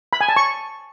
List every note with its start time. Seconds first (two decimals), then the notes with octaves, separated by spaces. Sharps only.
0.13 B5
0.21 G#5
0.29 A5
0.37 C#6